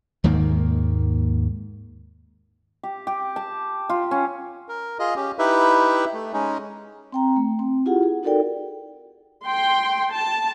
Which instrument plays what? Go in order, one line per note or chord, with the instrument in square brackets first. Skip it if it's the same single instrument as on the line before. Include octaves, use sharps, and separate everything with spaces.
[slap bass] D#2 G#2 D#3 A#3
[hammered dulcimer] G4
G4
A5
F4
C#4
[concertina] A#4
F4 G#4 D#5
C#4 G4
D#4 E4 G4 B4 E5
A3
G#3 C#4 D#4
[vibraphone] C4 G5 A#5
A3
C4
E4 F4 G4 G#4 F#5
G#4
D#4 F#4 A4 A#4 D5 G5
[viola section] G5 C6
A5